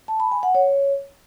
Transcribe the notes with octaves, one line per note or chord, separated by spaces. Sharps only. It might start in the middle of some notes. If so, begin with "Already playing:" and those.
A5
B5
G#5
F#5
C#5